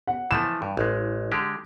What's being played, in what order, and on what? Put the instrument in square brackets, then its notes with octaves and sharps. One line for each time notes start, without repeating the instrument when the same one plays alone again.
[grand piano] F#5
[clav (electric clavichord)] E3 F3 A3 [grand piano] E7
[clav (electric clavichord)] G2
A1 G#3
D3 G#3 G4